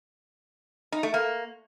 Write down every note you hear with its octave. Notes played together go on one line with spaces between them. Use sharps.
D#4
A3
A#3